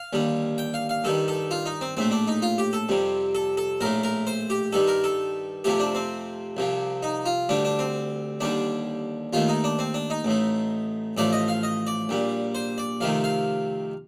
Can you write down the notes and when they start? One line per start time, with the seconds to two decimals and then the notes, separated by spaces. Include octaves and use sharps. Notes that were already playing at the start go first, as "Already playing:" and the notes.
Already playing: F5
0.13 D#2 D3 G3
0.58 G5
0.74 F5
0.89 F5
1.04 G2 D#3 G3 A4
1.28 A4
1.51 F4
1.66 D#4
1.81 C4
1.97 A#1 A2 A3 C4
2.11 D4
2.27 D#4
2.42 F4
2.58 G4
2.73 A4
2.89 F2 C3 G3
3.35 A4
3.57 A4
3.81 A#1 A2 A3 A#4
4.03 A#4
4.27 C5
4.50 G4
4.73 G2 D#3 G3 A4
4.88 A#4
5.04 A4
5.64 F2 C3 F3 A3 G4
5.80 D4
5.95 C4
6.57 C2 C3 F3
7.03 D#4
7.26 F4
7.49 D2 D3 G3 D4
7.65 D4
7.79 C4
8.40 D#2 D3 G3 D4
9.33 D#2 D#3 A3 F4
9.48 D#4
9.64 D4
9.79 C4
9.94 D4
10.10 D#4
10.24 A1 A2 A3
11.17 A1 A2 F3 A3 D5
11.33 D#5
11.48 F5
11.63 D#5
11.87 D5
12.09 A#1 A#2 G3
12.55 C5
12.78 D5
13.01 F2 C3 D#3 A3 F5
13.24 F5